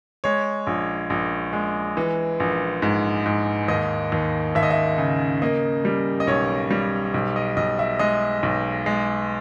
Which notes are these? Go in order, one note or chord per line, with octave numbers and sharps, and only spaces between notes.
G#3 C#5
A#1
A#1
G#3
E3
A#1
G#2
G#2
D#2 D#5
D#2
D#2 E5
D#5
E5
C#3
A#3 D#5
G3
D#5
B1 C#5
G3
B1
D#5
B1 D#5
E5
G#3 D#5
B1
G#3